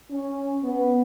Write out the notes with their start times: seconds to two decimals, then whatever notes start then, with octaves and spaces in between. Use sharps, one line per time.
0.11 C#4
0.63 B3